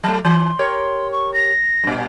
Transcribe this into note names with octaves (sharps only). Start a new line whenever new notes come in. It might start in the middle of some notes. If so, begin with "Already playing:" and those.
F#3 A3 A5
E3 C6
G4 A#4 C#5
C#6
A#6
G2 A#2